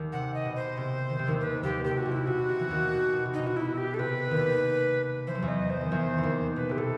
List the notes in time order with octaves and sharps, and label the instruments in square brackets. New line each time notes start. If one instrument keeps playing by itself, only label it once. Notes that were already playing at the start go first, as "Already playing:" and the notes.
Already playing: [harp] D#2 D#3
[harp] C3 [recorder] F#5
[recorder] D#5
[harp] B2
[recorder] C5
[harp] C3
D#3
C3
D#2 D#3
[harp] C3 [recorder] B4
[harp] D#2 D#3 [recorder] G4
[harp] C3 [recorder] G4
[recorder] F#4
[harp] C3
[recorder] E4
[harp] B2 [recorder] F#4
[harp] C3
E3
D#2 D#3
B2
C3
[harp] B2 [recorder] D#4
[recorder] F#4
E4
G4
A4
[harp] C3 [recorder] B4
[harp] D#2 D#3
[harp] E3 [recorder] C5
[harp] F#3
E2 E3
[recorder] D#5
C5
[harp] D#3
E2 E3
E3
D#2 D#3
[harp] B2 [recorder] B4
[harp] C3 [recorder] G4
[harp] B2 [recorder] A4